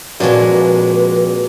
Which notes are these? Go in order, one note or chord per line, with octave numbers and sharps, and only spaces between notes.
F2 A#2 G#3 D4 F#4 B4 C#5